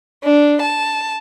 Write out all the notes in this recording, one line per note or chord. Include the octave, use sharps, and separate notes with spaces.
D4
A5